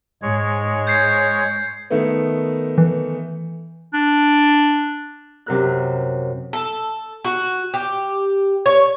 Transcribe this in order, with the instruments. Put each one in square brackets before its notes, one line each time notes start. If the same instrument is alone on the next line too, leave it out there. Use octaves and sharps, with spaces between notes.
[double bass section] G#2 [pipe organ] G#3 C#5
[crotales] G6 G#6 C7
[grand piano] D#3 A3 B3
[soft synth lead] E3
[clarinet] D4
[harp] F#2 C3 F#3 A#4 F6 F#6
[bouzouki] A4
F#4
G4
C#5